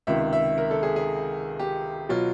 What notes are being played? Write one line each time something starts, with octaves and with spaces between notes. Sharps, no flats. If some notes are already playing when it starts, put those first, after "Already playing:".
C#2 C3 D#3 E5
E5
A#4
A4
G#4
G#4
G4
B2 F#3 F4